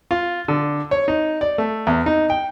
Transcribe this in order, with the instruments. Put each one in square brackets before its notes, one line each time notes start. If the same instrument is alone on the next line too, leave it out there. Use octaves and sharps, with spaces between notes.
[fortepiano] F4
D3
C#5
D#4
D5
A3
E2
D#4
G5